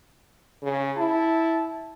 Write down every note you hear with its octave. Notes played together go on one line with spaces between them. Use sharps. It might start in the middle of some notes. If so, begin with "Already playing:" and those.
C#3
E4 A5